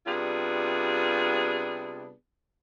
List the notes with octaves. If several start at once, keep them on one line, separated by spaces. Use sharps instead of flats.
C3 G3 B3 D4 F4 G#4